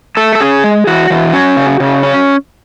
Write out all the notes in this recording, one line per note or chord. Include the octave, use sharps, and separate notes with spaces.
A3 A4
A4
C#4 G#4
G#3
E3 F#4
E3
C#4
C#3
C#3
C#4